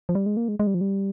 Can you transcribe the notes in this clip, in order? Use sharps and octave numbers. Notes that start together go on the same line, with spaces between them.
F3
G3
G#3
A#3
G#3
G#3
G3
F3
G3